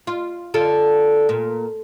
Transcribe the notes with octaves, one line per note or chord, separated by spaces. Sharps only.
F4
D3 F4 A4
A#2